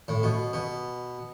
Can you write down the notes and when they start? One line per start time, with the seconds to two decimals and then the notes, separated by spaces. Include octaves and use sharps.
0.08 A2
0.23 B2
0.53 B2